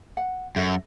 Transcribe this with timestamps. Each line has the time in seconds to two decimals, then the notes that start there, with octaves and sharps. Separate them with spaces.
0.17 F#5
0.56 F#2 A4 D#5 E5